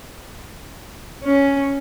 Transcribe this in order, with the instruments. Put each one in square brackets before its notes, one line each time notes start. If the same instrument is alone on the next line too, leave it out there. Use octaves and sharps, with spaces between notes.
[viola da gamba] C#4